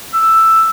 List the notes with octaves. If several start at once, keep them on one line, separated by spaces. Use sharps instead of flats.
E6